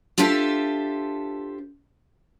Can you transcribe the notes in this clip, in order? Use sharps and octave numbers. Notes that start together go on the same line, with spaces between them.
D4 F4 G4 A4 C5 E5